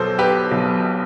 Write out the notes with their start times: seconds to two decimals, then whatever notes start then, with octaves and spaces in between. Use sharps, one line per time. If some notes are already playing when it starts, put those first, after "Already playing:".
Already playing: B1 B2 F#3 A4 C5
0.19 G4 B4
0.51 B1 B2 F#3